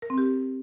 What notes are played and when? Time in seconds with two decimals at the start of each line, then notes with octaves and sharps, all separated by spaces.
0.02 A#4
0.10 C4
0.18 G4